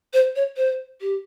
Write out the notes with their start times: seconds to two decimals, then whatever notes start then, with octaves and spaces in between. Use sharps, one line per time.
0.13 C5
0.36 C#5
0.57 C5
1.01 G4